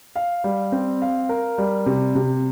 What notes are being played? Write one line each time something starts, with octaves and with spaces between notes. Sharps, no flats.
F5
G3
C4
F5
A#4
G3
C3
C3